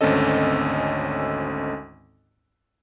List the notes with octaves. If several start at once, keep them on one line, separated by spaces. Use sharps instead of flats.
G#1 D2 C4 C#4 A4 D#5